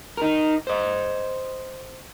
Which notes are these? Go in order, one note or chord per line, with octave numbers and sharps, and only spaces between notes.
D#4 A#4
C5 D#5